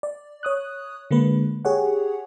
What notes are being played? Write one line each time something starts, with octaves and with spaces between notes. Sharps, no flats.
D5
C#5 D#6 F#6
D3 G#3 A#3 B4
G4 G#4 C#5 F#5